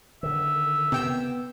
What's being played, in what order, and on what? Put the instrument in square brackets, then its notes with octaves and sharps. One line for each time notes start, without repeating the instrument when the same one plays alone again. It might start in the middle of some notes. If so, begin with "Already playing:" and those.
[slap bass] D3 D#3 [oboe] E5
[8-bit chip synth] C3 G5 E6 [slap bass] B3